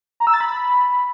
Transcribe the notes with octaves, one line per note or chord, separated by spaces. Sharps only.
A#5
E6
A6
B5